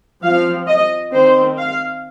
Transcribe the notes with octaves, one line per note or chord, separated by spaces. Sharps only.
F3 C4 F5
D#5
D#3 C4 C5
F5